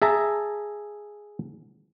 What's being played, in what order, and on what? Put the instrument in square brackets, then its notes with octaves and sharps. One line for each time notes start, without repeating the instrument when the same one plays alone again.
[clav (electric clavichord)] G#4 E5 A5 A#5